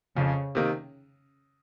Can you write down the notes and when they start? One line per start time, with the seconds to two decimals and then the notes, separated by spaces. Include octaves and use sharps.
0.16 F2 C#3
0.55 C3 D#3 A#3